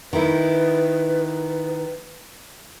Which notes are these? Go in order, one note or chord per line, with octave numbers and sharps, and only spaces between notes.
D#3 E4 B4